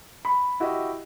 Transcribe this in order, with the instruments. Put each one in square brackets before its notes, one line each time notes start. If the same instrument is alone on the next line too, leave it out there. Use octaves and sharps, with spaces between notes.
[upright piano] B5
E4 F#4 G4 D#5